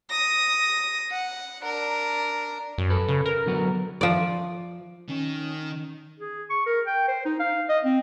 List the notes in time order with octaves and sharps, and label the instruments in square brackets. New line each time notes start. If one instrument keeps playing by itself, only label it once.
[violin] D#6 A#6
F#5
D4 A#4
[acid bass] F#2
[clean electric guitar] A4 B4
[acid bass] C#3
A#4
[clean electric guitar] D3 F#3 B3
[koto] F3 D5
[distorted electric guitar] D#3 [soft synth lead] C#4
[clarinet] G#4
C#6
A#4
G5
C5
D#4
F5
D#5
C4